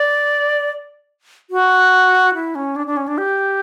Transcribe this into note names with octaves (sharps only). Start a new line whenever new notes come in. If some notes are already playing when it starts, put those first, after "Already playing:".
Already playing: D5
F#4
E4
C#4
D4
D4
C#4
D4
G4